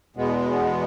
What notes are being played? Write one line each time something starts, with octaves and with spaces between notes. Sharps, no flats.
E2 B2 G#3 B3